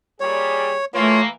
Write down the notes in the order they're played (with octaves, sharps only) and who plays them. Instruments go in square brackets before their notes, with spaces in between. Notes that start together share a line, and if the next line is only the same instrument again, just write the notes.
[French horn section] A#2 G3 G#4 [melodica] C#5
[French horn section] E3 A#3 [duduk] A3 [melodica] F4 C#5